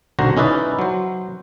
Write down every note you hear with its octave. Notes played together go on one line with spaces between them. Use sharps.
B1 D3 F#4 C5 A#5
C#4 D#4 E4 B4 D5
F#3 C5